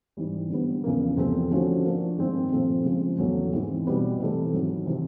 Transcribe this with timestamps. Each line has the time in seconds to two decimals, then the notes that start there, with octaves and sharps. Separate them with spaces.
0.17 G#2 E3 G3
0.50 D3 G3 B3
0.84 E2 C#3 F3 A#3
1.17 E2 C3 F3 A3 C4
1.51 D3 F3 A3 C#4 F#4
1.85 F3 A#3 D4
2.18 G2 D#3 G#3 C4
2.52 A#2 F3 A3 C4
2.85 C#3 F3 G#3
3.18 E2 C#3 F#3 A3 C#4
3.53 G#2 E3 G#3 C4
3.86 B2 G3 B3 D#4
4.20 C3 E3 A3
4.53 G#2 D#3 F#3
4.86 C3 E3